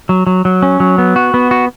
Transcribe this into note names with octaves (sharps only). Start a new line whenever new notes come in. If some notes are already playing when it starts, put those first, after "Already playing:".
F#3
F#3
F#3
C#4
F#3
B3
F#4
B3
F#4